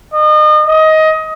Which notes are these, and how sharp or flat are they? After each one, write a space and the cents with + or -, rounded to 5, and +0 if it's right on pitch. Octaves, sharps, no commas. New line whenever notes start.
D#5 -35
D#5 +20